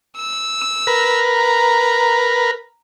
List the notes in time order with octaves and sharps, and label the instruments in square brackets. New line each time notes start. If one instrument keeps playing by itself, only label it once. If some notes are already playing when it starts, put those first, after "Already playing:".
[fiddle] E6
[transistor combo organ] A#4 B4
[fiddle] A#5